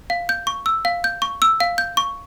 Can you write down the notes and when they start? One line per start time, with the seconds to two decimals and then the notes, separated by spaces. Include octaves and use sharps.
0.10 F5
0.29 G6
0.47 C#6
0.66 E6
0.85 F5
1.04 G6
1.22 C#6
1.42 E6
1.60 F5
1.78 G6
1.97 C#6